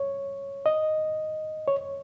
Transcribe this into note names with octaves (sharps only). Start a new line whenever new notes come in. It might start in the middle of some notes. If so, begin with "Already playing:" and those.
Already playing: C#5
D#5
C#5